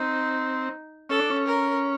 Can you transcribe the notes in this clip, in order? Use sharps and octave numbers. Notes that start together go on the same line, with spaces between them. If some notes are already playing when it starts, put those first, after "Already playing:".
Already playing: C4 D#4
C#4 A4
D4
C#4
A#4